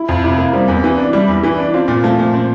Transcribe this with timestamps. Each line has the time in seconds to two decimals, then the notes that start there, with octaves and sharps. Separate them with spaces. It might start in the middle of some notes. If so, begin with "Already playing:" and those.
Already playing: E4
0.09 F2
0.24 C3 E4
0.38 A#3
0.53 G3 C4
0.68 E2
0.84 E3
0.98 D4
1.13 G3 E4
1.28 E2
1.43 E3
1.58 D4
1.73 C4 F4
1.88 A#2
2.04 F3 A3
2.19 A#2
2.34 C4